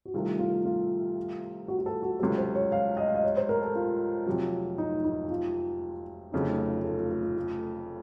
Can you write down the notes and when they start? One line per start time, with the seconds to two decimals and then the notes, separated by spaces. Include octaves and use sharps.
0.05 F#4
0.14 C2 C3 D#3 A3 F4
0.39 F4
0.65 F4
1.68 F#4
1.79 F#4
1.86 A4
2.02 F#4
2.20 C#2 C3 F#3 A4
2.38 C5
2.55 C#5
2.72 F5
2.97 D#5
3.08 F5
3.15 D#5
3.24 C#5
3.37 C5
3.49 A#4
3.62 A4
3.76 F4
4.27 F1 F2 C3 F#3
4.78 D#4
5.04 D#4
5.30 F4
6.32 F1 F2 C#3 F#3 A3 D#4
6.58 F4
6.84 A4
6.97 F4
7.10 A4
7.23 F4
7.37 F4